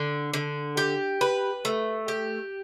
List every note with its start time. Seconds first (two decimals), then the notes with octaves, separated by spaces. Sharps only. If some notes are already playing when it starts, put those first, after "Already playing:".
Already playing: D3
0.34 D3
0.77 G4
1.21 B4
1.65 A3
2.08 G4